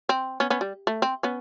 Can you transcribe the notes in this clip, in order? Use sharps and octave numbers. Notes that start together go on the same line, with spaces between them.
C4
B3 C#4
B3 C#4
G3
A3
C4
B3 C#4